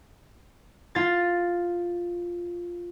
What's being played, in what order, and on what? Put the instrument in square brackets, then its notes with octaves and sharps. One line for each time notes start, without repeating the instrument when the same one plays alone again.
[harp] F4 A6